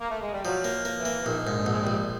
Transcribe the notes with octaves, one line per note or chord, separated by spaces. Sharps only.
A#3
A3
G#3
G3
F3 F#3
A#3
A#3
E3
A#3
E3
A#1 D#3
G#2
D3
A#1
G#3
G3
A#1